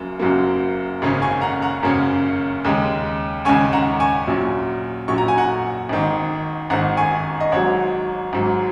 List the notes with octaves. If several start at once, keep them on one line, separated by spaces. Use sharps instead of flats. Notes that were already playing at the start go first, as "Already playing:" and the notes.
Already playing: F#1 F#2 F#3 A#3
F#1 F#2 F#3 A#3
G#1 F#2 C#3 A#3 C#4
G#5 C#6
F#5 A#5
F#5 A#5
G#1 F#2 C#3 A#3 C#4
D#2 C#3 G#3 C#4
D#2 C#3 G#3 C#4 G#5 C#6
F#5 A#5
G#5 C#6
A#1 A#2 F#3 C#4
A#1 A#2 F#3 C#4 C#6
A#5
G#5
F#5 A#5
G#1 G#2 D#3
G#1 G#2 D#3 F#5 A#5
G#5 C#6
D#5
G#1 G#2 F#3 C#5 F#5
G#1 G#2 F#3